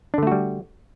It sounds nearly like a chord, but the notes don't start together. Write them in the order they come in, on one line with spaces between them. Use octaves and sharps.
D4 D3 A3 F#4 G3